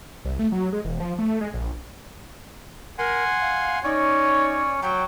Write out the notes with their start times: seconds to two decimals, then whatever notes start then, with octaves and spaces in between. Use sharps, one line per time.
0.25 C2
0.39 A3
0.52 F#3
0.72 G#3
0.85 E1
1.00 F3
1.18 A3
1.41 G#3
1.54 A#1
2.99 A#4 F#5 G#5 C6
3.41 F5
3.84 C#4 D#4 C#5 D5
4.83 F#3 G5